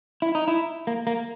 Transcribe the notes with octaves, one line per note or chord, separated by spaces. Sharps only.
E4
D#4
E4
A#3
A#3